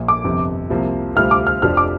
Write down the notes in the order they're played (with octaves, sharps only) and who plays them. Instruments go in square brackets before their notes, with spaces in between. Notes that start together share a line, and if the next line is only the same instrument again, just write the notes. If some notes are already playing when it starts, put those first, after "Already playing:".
Already playing: [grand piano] A#1 A#2 A#3
[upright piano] D6
[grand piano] G1 F2 C3
C2 C3 F3 A#3
[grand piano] D2 C3 G3 C4 F4 [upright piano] F6
[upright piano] D6
F6
[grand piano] F1 F2 F3 D4 G4 [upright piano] F6
[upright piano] D6